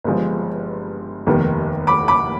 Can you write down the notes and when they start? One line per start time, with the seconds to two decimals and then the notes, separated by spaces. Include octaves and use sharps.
0.04 G1 G2 F3 G#3
1.27 F1 D#2 D#3 G3 B3
1.87 B5 D6
2.08 B5 D6